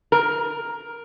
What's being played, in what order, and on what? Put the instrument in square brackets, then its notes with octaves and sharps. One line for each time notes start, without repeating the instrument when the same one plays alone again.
[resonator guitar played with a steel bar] A#4